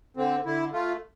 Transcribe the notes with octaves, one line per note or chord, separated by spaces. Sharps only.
D3 C4
D3 E4
A3 F4